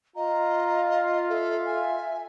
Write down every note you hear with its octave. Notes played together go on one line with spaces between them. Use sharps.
F4 D#5 A#5
A4 E5
G#5